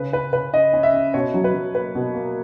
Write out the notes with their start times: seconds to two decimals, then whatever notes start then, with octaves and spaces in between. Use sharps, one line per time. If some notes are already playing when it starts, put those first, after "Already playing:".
Already playing: C#3 B4
0.13 C#4 B4
0.33 C#3 B4
0.53 C#4 D#5
0.73 C#4
0.83 E5
0.93 C#4
1.14 B2 C#5
1.34 F#3
1.44 B4
1.54 F#3
1.75 A#3 B4
1.95 B2
2.15 A#3